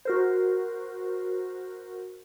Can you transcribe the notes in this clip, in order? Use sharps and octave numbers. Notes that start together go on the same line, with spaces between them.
F#4 A#4 C5